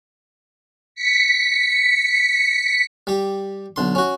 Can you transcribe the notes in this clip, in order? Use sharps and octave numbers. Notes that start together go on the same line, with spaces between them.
B6 C#7
G3 G4
B1 D3 C6
C#4 F#4